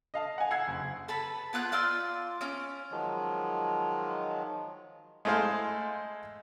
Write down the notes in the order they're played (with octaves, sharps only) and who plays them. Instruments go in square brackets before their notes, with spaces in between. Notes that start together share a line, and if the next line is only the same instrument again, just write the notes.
[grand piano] D#5 F5 A5
F#5 G#5
F#5 E6 G#6 C7
F#1
[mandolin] A4 B4 A5 B5
B3 F4 F#6 G6
F4 D5 C6 E6
C#4 D6
[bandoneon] D#3 F3 F#3 G#3
[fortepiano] G#3 A3 E4 C5 F5